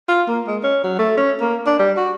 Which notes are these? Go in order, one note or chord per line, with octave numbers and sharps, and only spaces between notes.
F4
A#3
G#3
C#4
F#3
A3
C#4
A#3
D4
G3
F#4